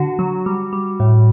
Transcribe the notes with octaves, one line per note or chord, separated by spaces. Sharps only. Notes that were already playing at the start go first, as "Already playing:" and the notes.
Already playing: D3 F#4
F#3
G3
G3
A2